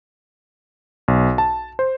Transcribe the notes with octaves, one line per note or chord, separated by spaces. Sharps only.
B1
A5
C5